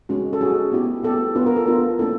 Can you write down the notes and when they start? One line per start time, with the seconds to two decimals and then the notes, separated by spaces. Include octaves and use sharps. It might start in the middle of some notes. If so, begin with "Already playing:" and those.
0.09 G#3 C#4 F#4
0.33 A4
0.41 G#3 C#4 F#4 G#4
0.72 B3 E4 G4
1.03 B3 E4 G4 A4
1.35 B3 D4 F4 B4
1.46 A#4
1.56 A4
1.66 B3 D4 F4 A#4
1.99 A#3 C#4 E4 A4